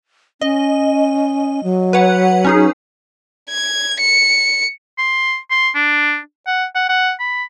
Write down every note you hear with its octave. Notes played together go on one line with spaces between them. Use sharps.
C#4 D#5
F#3
B4 C#5 F#5
C#4 D#4 G#4
G#6
C#7
C6
C6
D4
F#5
F#5
F#5
B5